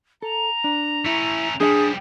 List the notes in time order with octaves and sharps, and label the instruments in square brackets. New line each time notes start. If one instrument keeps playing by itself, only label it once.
[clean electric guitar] A4 [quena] A#5
[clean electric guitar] D4
[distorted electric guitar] A3 C#4 [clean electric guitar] E4
[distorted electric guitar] F3 G3 [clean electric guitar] D4 D#5 G#5 [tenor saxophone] G#4